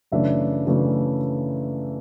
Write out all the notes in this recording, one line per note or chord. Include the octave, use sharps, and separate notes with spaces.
F#2 C#3 E3 A3 D4 E5
F#2 C#3 E3 A3 D4